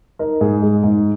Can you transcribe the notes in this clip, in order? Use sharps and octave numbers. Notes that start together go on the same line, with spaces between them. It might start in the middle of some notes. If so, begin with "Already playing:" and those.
D#4 A#4
G#2 G#4
G#3 G#4
G#2